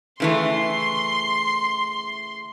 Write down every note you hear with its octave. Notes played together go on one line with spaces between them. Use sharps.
C#3 E3 A3 C6